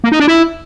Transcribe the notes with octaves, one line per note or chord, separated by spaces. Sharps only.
A#3
D#4
D4
E4